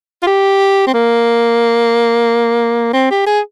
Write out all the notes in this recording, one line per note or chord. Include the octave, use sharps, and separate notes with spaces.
F4
G4
C4
A#3
C4
G4
G#4